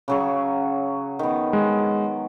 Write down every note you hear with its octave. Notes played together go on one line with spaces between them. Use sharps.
C#3 F#3 G#4
D#3 B3
G#3